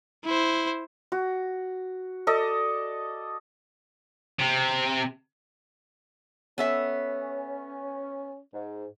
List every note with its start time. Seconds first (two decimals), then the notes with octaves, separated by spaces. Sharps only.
0.25 E4 C5
1.12 F#4
2.27 A4 D5 D#5
4.39 C3
6.58 B3 C#4 A4 E5
8.53 G#2